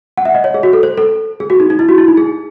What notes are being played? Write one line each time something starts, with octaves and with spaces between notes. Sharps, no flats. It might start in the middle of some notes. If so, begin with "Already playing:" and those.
F#5
E5
D#5
C#5
G#4
F#4
A4
C5
A4
G#4
F#4
D#4
D#4
E4
F#4
E4
D#4
G#4